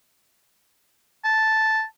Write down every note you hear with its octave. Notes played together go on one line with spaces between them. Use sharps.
A5